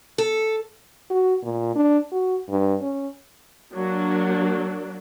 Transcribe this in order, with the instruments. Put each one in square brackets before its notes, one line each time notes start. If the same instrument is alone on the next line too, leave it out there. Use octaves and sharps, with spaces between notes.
[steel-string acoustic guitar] A4
[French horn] F#4
A#2
D4
F#4
G2
C#4
[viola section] F#3 A#3 D4